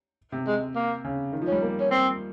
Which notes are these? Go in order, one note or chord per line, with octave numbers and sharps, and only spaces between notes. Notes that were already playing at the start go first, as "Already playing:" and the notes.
C3
G#3
A#3
C#3
D#3
F3
G3 C#4
A#3
C#4
C4